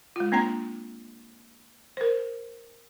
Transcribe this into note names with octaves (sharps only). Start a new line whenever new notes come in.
G#3 F4
A#3 C4 D4 G5 A#5
A#4 C5